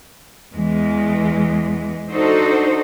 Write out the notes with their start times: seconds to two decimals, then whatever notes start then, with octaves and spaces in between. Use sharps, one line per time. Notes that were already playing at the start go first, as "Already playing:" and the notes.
0.54 E2 E3 G#3
2.10 D4 D#4 F#4 A4 C5